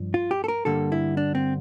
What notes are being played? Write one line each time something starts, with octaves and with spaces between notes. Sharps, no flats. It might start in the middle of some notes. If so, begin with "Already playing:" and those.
Already playing: G2 F3
F4
G4
A4
A#4
G2 D3 G3 A#3 A4
E4
D4
C4